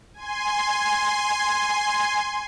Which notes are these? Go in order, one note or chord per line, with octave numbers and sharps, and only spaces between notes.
G#5 C6